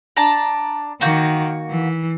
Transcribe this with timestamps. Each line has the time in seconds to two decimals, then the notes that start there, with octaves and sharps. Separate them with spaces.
0.16 D4 A5 A#5
1.01 D#3 A#3 F#4 G6
1.70 E3